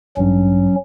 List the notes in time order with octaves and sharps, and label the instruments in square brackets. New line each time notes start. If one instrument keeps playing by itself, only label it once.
[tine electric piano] A1 G2 [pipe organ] F#3 C#4